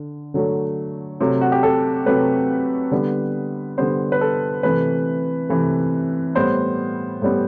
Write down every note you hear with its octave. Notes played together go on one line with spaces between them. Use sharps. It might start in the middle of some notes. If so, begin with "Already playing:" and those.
Already playing: D3
D3 F#3 A3
C3 F#3 A3
F#4
G4
A4
C3 F#3 A3 B4
D3 G3 B3
D3 G3 B3 C5
B4
A4
C3 E3 A3 B4
C3 E3 A3
A2 G3 B3 C5
A2 G3 B3